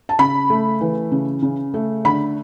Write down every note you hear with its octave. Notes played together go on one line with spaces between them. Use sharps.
A5
C#3 B5
A3
E3
C#3
C#3
A3
D3 B5